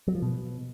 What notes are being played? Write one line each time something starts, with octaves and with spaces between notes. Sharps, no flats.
F#3
F3
B2